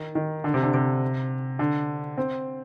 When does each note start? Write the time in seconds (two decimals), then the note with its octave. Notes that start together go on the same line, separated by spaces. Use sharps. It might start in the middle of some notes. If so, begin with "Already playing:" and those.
Already playing: D#3
0.15 D#3
0.44 D3
0.54 C3
0.63 D3
0.74 C3
1.59 D3
2.18 C4